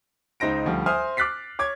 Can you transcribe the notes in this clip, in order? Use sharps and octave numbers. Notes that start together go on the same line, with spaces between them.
C#2 D#4 C5 A#6 D7
D2 F3 G3
C5 E5 G#5 C6 D#6 F6
D6 F6 F#6 A6 B6 C7
C#5 D6 G#6